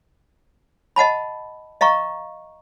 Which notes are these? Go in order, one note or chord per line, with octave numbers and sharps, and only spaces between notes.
D#5 F#5 A5 B5
D#5 F5 A#5 C#6